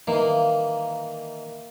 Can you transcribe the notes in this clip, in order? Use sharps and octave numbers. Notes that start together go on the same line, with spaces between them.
D#3 E3 A#3